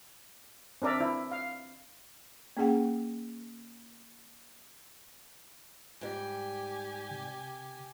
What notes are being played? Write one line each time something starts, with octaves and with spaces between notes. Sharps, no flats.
C4 D4 A#4 D5 E5
E4
F5
A#3 C#4 G#4 F#5 G5
G#2 G3 G4 G#5
C3